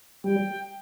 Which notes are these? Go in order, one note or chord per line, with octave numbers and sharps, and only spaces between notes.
G3 G5